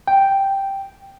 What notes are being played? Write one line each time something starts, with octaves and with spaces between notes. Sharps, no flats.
G5